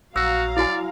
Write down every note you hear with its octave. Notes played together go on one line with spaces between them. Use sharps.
A#1 F#3 F#4 F5 A#5 E6
E4 F#4 D5 G#5